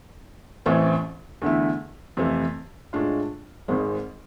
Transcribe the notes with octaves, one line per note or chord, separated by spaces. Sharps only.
A1 A2 E3 A3 C4
E2 D3 A3 E4
F2 C3 E3 A3
A2 G#3 D4 F4
G#1 G#2 G#3 C4